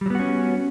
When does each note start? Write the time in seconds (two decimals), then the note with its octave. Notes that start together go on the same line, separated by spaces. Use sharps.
0.01 G3
0.06 F#3
0.10 B3
0.15 F#4
0.19 C#4